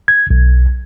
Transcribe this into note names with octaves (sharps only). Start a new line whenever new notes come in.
G#6
B1